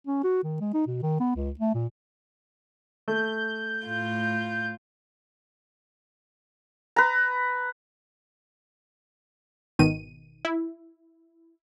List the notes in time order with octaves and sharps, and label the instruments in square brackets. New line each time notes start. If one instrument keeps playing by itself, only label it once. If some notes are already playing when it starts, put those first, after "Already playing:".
[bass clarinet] C#4
F#4
D#3
G#3
D#4
B2
D#3
B3
C#2
A3
A#2
[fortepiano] A3 [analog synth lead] G6
[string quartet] A2 F4
[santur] B4 A#5
[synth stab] G#1 B2 D#3 D#7
E4